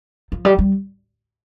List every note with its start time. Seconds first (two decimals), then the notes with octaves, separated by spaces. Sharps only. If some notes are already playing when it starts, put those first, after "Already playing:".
0.32 F3
0.45 G3
0.59 G3